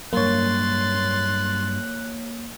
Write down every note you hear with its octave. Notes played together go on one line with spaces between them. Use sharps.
G2 F#3 A#3 C#5 C6 F#6 A6